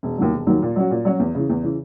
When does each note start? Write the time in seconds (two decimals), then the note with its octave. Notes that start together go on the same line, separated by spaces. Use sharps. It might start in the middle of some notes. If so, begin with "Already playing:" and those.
0.03 E1
0.18 D#2 D#3 F#3
0.33 E1
0.47 D#2 D#3 F#3
0.62 A#2
0.76 F#3 C#4 F#4
0.91 A#2
1.05 F#3 C#4 F#4
1.20 E2
1.35 C#3 E3
1.50 E2
1.63 C#3 E3